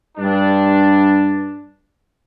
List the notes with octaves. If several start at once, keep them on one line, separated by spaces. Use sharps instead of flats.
G2 D4